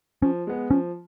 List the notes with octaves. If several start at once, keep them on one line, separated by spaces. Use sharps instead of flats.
F3 C#4
G#3 B3
F3 C#4